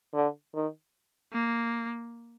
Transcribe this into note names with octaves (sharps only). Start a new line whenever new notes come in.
D3
D#3
A#3